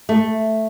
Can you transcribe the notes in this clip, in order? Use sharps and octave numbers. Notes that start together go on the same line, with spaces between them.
A3